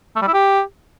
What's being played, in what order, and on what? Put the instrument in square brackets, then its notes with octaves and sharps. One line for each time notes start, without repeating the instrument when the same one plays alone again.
[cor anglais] A3
G3
E4
G4